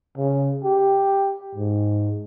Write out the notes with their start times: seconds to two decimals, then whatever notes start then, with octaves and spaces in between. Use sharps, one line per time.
0.17 C#3
0.64 G4
1.55 G#2